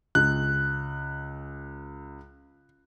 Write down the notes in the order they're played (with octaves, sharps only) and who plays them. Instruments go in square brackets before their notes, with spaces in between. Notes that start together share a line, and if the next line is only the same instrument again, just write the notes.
[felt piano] C#2 [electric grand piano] F#6